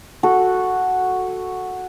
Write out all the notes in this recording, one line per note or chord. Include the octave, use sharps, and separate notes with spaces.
F#4 A4